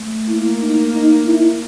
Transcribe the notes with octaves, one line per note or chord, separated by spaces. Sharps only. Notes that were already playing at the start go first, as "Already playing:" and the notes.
Already playing: A3
A#3 E4
D#4
D#4
E4